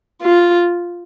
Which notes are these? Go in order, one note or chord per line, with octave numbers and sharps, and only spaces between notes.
F4